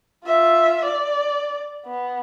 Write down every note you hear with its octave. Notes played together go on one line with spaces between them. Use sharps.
F4 E5
D5
B3